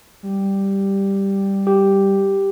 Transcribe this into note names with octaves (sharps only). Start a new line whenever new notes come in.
G3
G4